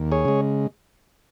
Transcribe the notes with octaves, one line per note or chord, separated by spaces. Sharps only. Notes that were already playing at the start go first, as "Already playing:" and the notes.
Already playing: D#2
G#4 C#5
C#3 G#3